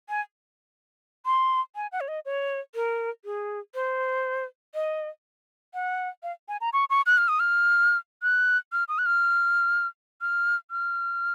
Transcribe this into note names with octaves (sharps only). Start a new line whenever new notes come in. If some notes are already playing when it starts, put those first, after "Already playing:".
G#5
C6
G#5
F#5
C#5
D#5
C#5
A#4
G#4
C5
D#5
F#5
F5
G#5
A#5
C#6
C#6
F#6
F6
D#6
F6
F#6
F6
D#6
F#6
F6
F6
F6